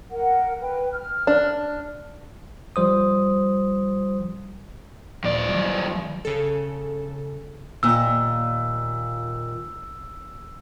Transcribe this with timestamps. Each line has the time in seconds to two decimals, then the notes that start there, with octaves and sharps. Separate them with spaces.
0.11 A#4 F#5
0.59 B4 G5
0.93 F6
1.27 D4
2.76 F3 G3 C5 D#6
5.24 D#1 F2 A#2 F3 D5
5.49 D#3 F#3 G3
6.25 C#3 A4
7.83 D#2 A#2 E6